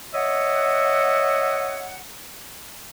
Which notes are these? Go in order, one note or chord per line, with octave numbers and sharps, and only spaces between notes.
C#5 D#5 E5 F#5